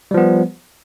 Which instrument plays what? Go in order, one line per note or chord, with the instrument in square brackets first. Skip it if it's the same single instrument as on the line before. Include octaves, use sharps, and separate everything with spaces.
[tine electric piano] G3
F3
B3